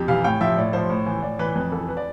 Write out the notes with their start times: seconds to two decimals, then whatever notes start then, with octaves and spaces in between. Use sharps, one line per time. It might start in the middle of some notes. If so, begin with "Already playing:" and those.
Already playing: F2 G4
0.08 C3 E3 F5
0.24 A2 G5
0.41 F3 E5
0.57 A2 D5
0.73 F3 C5
0.90 A2
1.06 E3
1.22 A2 D5
1.39 E3 B4
1.55 F2 B4
1.72 E3 A4
1.88 B4
1.97 D5